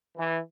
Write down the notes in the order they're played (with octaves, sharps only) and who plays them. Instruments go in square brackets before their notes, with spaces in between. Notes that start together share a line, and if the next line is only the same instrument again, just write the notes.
[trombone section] E3